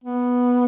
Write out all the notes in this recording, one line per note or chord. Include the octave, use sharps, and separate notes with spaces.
B3